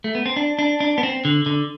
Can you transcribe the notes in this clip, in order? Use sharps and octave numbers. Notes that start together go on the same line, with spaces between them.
A3
B3
C4
D4
D4
D4
B3
C4
D3
D3